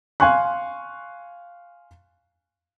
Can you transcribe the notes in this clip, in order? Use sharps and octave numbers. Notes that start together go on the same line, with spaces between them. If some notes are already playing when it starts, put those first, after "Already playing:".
F5 G#5 C6 C#6 F#6